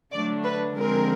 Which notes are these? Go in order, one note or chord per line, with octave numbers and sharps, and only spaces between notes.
D3 F#3 A3 D4 D5
B4
D3 F3 G#3 C4 A#4